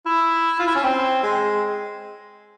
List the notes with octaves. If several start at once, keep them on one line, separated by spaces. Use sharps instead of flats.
E4
F4
E4
C#4
C4
G#3